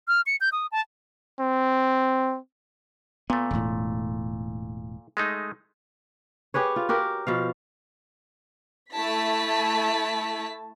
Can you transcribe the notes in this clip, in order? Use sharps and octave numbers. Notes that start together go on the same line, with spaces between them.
F6
C#7
G6
D#6
A5
C4
A#2 A3 B3
E1 A2
G#3 A3 D#4
G4 G#4 B4 C#5
F4
F#4 G4 A#4
B2 F3 F5
A3 E4 A5 B6